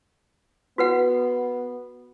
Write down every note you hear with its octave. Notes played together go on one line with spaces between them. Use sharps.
B3 F#4 B4 F#5